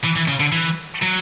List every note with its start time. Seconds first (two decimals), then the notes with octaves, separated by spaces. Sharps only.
0.04 E3
0.16 E3
0.28 C#3
0.40 D3
0.52 E3
1.02 F#3